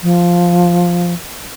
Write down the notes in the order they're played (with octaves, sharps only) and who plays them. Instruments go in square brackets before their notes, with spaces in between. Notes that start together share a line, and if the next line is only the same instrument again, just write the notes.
[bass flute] F3